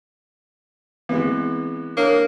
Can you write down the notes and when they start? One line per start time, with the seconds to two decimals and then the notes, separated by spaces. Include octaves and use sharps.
1.09 E3 G#3 B3 C4
1.97 A#3 D4 C#5 D#6